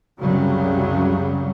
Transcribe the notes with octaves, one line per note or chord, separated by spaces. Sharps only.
C2 F#2 C#3 F#3 G3